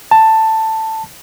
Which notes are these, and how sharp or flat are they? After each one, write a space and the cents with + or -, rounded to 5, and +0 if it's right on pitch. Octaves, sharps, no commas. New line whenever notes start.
A5 +10